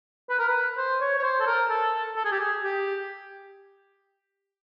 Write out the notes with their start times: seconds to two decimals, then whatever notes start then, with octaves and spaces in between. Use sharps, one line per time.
0.30 B4
0.39 A#4
0.49 B4
0.77 C5
1.01 C#5
1.18 C#5
1.23 C5
1.40 A4
1.46 A#4
1.70 A4
2.16 A4
2.25 G#4
2.32 G4
2.39 G#4
2.64 G4